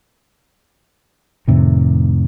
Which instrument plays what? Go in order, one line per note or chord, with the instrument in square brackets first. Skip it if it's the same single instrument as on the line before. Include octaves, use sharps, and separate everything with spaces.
[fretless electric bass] F2 A2 C3 D#3